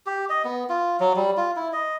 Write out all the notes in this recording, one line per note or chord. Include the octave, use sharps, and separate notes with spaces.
G4
D#5
B3
F4
F#3
G3
F4
E4
D#5